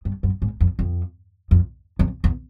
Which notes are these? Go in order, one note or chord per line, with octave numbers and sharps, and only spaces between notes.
G2
F#2
G#2
F2
F2
F2
F2
E2